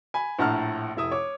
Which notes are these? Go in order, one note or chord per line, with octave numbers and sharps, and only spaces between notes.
G#5 B5
A#1 A2 F#5 A5 A#5 F6
F1 E4 E5 D#6
C#5 D6